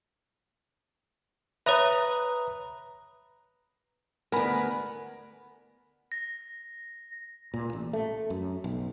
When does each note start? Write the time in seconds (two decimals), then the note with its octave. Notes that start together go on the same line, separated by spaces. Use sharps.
1.66 B4 C#5 E5 A#5 D#6
4.32 D2 B3 A#4 G#5 B5
6.12 A#6
7.54 A#2
7.73 A1
7.93 A3
8.30 F#2
8.64 B1